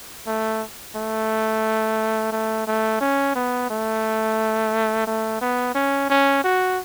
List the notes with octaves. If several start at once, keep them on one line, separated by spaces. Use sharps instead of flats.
A3
A3
A3
A3
C#4
B3
A3
A3
B3
C#4
C#4
F#4